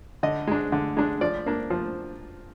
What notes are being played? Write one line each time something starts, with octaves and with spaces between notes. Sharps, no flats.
D3 D#5
G#3 D4
D3
G#3 D4
F3 D5
A#3 D4
F3